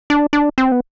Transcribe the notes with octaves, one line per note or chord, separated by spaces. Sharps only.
D4
D4
C4
B3